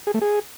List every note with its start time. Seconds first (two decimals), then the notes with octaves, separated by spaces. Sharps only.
0.07 G#4
0.14 A3
0.22 G#4